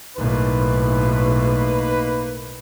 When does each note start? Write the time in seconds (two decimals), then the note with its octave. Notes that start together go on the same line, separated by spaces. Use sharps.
0.17 B1 A2 A#3 D#4 B4